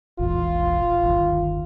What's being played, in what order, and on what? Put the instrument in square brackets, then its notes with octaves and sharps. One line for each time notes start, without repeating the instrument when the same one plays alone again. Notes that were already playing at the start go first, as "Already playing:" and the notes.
[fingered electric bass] E1 A#1 E2 [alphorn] F4
[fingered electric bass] G1 D#2